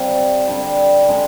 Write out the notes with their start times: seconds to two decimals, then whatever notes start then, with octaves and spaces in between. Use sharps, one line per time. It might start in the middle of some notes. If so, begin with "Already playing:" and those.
Already playing: C3 G3 F5
0.47 D3 G3
1.09 D3 G#3